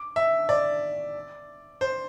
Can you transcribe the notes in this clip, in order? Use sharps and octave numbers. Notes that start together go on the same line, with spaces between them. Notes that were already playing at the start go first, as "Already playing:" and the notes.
Already playing: D6
E5
D5
C5